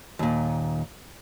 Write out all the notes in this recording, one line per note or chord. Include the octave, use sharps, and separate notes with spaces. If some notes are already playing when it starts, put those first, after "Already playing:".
D#2 A#2